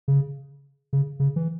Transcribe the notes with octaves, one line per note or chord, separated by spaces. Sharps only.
C#3
C#3
C#3
E3